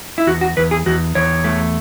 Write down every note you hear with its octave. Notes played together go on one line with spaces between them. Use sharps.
E4
E2 F#4
F#4
E2 B4
G#4
E2 F#4
E2 C#5
A3